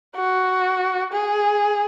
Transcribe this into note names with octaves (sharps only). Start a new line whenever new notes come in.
F#4
G#4